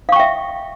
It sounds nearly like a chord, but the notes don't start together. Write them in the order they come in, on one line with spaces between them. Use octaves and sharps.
F5 C#6 G5 E5